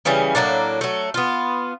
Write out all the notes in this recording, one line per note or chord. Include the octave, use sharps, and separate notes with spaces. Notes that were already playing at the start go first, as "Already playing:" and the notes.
C#3 E3 G3 C#4
A2 F#3 A#3 D4
F#3 A3
B3 F4